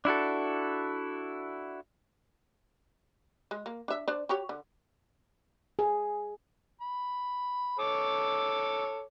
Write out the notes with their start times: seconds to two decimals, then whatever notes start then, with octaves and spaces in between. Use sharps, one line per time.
0.05 D4 E4 F#4 A4
3.51 G#3
3.66 A#3
3.88 D4 E5
4.08 D4 C5 D5
4.29 F#4 G4 C#5
4.49 D3
5.79 G#4
6.81 B5
7.79 A4 C#5 D6